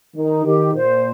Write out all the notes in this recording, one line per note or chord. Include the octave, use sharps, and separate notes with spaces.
D#3 D#4
D#3 G4
A#2 C5